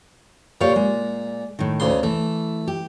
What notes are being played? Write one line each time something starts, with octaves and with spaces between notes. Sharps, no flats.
A#2 G4 C#5 F5
G#3
A2 D#3
D2 C#3 C6
E3 A3
G4